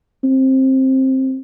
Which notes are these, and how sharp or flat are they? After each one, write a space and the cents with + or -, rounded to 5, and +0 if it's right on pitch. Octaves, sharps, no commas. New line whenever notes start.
C4 +15